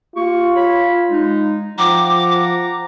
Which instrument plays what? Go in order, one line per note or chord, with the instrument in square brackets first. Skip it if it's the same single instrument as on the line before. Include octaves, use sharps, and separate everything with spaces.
[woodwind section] A#3 G4 C#6 [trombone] F4
[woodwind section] C#5 B5
G#3 D#4
[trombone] F3 [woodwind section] F#5 G5 A#5 [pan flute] D6